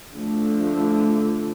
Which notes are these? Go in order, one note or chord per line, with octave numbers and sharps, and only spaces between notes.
D3 F3 A3